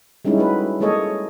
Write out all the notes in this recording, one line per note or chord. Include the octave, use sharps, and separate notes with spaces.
G3 G#3 C#4 D#4 E4
A3 F#4 B4
G#3 A#3 G#4 A4 C#5 D#5